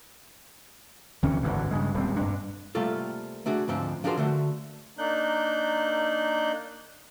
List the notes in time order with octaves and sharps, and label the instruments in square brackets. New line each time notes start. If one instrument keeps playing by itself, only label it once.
[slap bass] D2 C3 E3 C#4
G#1 D2 G2 E3
G2 C#3 G#3
D#1 G3 A3 C4
G2 D4
[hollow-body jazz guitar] C3 G3 A3 A#3 F4 A4
A3 D4 F#4 G#4
D2 G#2 F3 C4 D4
F3 D4 F#4 G#4 A#4 C5
D3 A3 F#4
[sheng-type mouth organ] A#3 D4 D#4 F#6 G6